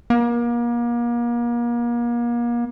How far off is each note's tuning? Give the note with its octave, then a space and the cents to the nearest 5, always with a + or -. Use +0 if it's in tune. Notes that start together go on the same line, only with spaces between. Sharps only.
A#3 +35